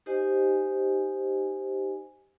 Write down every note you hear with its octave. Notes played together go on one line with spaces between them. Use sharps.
D#4 G4 C5 D#5 G#5